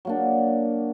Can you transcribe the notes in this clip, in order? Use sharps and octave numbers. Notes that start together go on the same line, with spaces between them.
F#3 A#3 D4